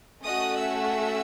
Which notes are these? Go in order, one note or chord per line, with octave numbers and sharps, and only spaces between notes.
A3 C#4 F#4 A4 D#5 D#6
E5 E6